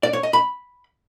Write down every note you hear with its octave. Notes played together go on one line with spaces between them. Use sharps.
D5
C#5
D#5
B5